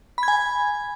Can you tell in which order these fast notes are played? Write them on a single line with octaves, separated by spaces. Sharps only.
B5 G#6 G#5